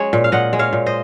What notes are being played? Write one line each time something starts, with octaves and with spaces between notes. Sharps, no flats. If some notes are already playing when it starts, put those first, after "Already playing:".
Already playing: G#3 C#4 C#5
A#2
F5
A#2 D#5 F#5
G#3
C#5 F5
A#2
C5 D#5